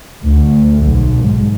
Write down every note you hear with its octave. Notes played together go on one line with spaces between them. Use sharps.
D2
B1
G#2